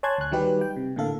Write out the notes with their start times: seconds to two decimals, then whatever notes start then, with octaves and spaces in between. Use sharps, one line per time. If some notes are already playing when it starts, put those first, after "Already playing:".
0.03 C#5 G#5 A5 C6 F#6 G#6
0.18 D2 F#6
0.32 D#3 F#3 G3 D#4 G4 B4
0.61 G5
0.76 C3
0.96 A2 D3 A#3 A4 F5